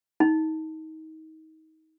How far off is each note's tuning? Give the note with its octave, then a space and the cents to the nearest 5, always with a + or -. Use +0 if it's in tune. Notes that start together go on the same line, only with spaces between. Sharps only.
D#4 +30